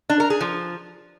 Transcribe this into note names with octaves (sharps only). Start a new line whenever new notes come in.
D4
A#4
G#4
F3